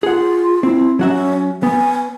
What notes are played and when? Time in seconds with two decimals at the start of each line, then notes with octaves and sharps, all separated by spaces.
0.03 F4 G#4 F#5
0.63 C4 E4
0.99 F#3 C#4 F#4 E5
1.63 B3 G#5